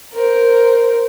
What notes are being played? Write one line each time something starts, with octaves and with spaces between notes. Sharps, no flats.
A#4 C5